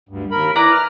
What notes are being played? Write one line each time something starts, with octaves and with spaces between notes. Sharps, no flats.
D2 G2
D#2 A#4 B5
E4 B4 D5 A#5
F6